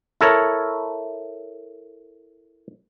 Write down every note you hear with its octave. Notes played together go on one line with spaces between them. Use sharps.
E4 A4 A#4 C#5